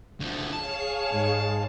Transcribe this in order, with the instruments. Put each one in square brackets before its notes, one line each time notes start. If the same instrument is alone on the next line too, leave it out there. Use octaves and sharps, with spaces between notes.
[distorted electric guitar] D2 F3
[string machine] G#4 C#5 F5 [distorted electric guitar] A5
[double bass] G#2